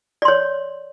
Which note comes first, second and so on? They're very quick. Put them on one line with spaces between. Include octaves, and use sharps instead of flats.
D5 C6 C#5